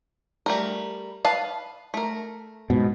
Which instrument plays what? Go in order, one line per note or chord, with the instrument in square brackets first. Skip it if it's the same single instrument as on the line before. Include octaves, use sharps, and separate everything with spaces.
[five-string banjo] G3 A3 A#4
B4 F5 A5
A3 A#4
[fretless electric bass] G#2 B2